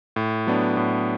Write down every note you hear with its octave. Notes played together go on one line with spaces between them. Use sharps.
A2
F#3 B3 D4
A2